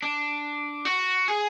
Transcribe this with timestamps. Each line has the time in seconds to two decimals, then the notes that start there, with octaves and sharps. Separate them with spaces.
0.03 D4
0.85 F#4
1.28 G#4